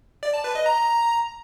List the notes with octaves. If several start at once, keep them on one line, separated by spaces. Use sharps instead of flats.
D5
A5
B4
D#5
A#5